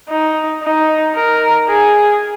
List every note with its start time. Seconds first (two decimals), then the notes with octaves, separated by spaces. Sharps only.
0.09 D#4
0.63 D#4
1.16 A#4
1.69 G#4